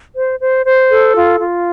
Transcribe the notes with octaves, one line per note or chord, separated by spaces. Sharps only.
C5
C5
C5
A4
F4
F4